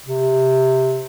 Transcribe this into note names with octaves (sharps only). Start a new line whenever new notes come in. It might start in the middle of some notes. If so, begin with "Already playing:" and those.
C3